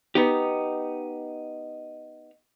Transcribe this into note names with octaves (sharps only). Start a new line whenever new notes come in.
B3 D#4 G4